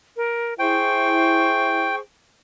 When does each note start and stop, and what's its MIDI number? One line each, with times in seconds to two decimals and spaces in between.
0.16 0.54 70
0.59 1.88 64
0.59 1.99 68
0.59 1.99 72
0.59 1.95 79
0.59 1.99 85